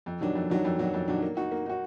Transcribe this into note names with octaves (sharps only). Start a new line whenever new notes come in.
F2
D#3 F#3 D4
F2
D#3 F#3 D4
F2
D#3 F#3 D4
F2
D#3 F#3 D4
A#3
D#4 F#4
A#3
D#4 F#4